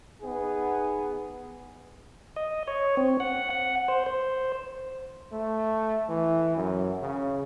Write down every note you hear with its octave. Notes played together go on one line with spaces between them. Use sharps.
B3 D#4 G#4
D#5
C#5
C4
F#5
F#5
C5
C5
A3
E3
F#2
C#3